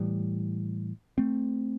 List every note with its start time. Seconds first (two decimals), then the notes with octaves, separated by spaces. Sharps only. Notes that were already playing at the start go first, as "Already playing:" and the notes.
Already playing: A2 E3 G3
1.18 A3 C4